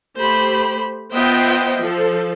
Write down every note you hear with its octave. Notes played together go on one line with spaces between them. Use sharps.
A3 G4 C5 B5
B3 F4 C5 D#5 E5 G5
F3 A4